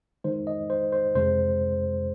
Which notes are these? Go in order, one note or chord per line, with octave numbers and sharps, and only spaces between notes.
D#3 G#3 D#4 C5
D#5
C5
C5
F2 C3 G#3 C5